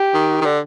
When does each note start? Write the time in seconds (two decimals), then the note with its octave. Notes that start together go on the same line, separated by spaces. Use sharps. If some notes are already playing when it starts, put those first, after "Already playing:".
Already playing: G4
0.14 D#3
0.41 D#3
0.45 D3